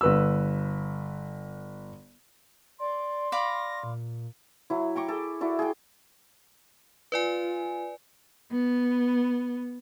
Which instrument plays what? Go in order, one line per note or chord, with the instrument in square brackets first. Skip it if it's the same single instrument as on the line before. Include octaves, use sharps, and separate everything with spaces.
[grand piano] G1 B4 E6
[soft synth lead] D5 [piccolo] C6
[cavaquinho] D5 F5 B5 [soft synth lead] A#6
[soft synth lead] A#2
[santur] F#3 E4
G5 A#5 C#6 D6
G#4 A4
E4 F#4 A4 D5
G#4 G5
[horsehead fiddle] F4 [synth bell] B4 D5 G#5
[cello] B3